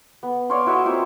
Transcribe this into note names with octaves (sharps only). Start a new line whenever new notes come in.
B3
C#5 D5 F5 C6
E4 F#4 D#5 E5
A#3 C4 E4 F4